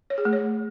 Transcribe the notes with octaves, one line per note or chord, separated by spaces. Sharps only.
C#5
G#4
A3
C#5